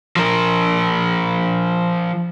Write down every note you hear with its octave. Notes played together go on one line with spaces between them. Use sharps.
F3 A#4